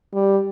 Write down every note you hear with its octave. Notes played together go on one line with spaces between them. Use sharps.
G3